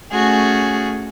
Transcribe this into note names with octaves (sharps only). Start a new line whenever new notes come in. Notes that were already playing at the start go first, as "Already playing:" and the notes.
A3 C#4 F#4 G#4